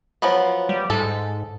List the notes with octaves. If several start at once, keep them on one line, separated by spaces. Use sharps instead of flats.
F3 F#3 B3
G3
G#2 A4